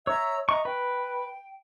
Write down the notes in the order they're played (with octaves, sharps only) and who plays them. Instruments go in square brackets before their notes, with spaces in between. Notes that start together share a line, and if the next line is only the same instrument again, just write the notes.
[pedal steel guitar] C#5 [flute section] E5 A#5 E6
[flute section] D#5 E5 A#5 [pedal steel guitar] C#6
[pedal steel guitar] B4 [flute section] G5